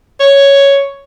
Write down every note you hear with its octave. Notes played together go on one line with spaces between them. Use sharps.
C#5